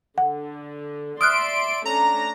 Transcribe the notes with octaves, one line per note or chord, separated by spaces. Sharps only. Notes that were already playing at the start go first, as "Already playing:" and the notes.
D3 F#5
D5 E5 C6 D#6 F6 F#6 D7
A3 C#4 D4 A#5